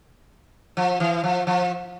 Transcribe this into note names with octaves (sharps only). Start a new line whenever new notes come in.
F3
E3
F3
F3